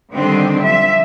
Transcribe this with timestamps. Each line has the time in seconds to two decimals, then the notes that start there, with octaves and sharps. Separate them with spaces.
0.14 D3 D#3 G3 C4 D4
0.62 F3 E5